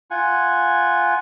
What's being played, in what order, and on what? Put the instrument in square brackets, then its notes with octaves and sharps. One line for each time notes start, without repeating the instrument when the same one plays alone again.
[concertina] F4 F#5 G#5